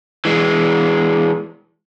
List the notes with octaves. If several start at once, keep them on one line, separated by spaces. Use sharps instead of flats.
E3 G#3